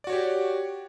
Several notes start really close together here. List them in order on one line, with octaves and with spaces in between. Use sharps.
D5 F#4 C#5 G4